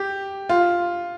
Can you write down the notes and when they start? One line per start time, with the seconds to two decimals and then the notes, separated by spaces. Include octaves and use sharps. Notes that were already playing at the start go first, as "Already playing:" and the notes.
Already playing: G4
0.49 F4